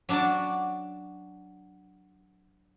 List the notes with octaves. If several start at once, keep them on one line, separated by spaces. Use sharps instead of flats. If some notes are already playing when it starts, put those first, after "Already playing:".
F#3 D4 F#4 D5 A5